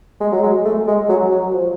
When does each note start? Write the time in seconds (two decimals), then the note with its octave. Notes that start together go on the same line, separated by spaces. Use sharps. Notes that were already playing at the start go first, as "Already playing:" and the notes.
0.20 G#3
0.32 F#3
0.43 G#3
0.65 A3
0.87 G#3
1.09 F#3
1.31 F#3
1.53 F3